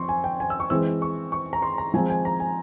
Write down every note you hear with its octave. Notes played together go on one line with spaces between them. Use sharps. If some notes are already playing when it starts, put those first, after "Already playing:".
Already playing: F3 C4 C6 C#6
G#5
G5
G#5
E6
C#6
E3 G#3 C4 E6
C#6
C#6
A#5
C6
A#5
F3 G#3 C4 G#5
G#5
A#5
G#5